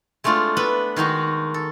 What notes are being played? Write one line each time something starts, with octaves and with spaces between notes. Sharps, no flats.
G#3 A3 C4 D4 F4
B3 B4 E5 A5 B5
D#3 G#3 D#4 F#4
A4